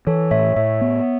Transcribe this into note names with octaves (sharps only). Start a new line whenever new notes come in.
E3 A4 C#5
A2 C#5 E5
A2 C#5 E5
B3